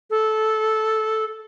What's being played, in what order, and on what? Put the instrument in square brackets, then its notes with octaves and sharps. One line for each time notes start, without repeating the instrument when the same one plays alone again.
[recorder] A4